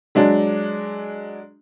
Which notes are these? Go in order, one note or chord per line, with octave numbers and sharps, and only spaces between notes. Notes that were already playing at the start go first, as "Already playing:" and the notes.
F#3 G#3 D4